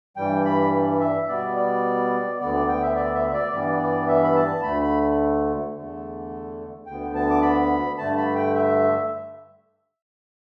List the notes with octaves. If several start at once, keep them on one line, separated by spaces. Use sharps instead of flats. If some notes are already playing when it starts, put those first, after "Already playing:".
G2 E3 G3 G5
B5
E5
B2 G3 B3 D5
D5
D2 D3 B3 D5
G5
E5
D5
E5
D5
G2 E3 G3 B3 D5
D5
E5
B5
A5
D2 D3 A3 B5
B5
E2 D3 A3
D2 D3 B3 G5
A5
D6
B5
G2 D3 A3 A5
B5
G5
E5